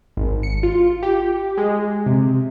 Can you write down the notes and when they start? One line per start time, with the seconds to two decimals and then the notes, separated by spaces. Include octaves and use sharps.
0.17 G#1
0.43 C#7
0.63 F4
1.03 G4
1.58 G#3
2.06 C3